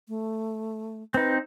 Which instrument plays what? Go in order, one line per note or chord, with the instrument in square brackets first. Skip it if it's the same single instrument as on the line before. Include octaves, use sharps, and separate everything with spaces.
[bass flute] A3
[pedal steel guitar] C4 D#4 [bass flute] B4